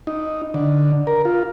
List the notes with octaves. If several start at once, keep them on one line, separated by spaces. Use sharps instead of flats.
D#4
D3
A#4
F4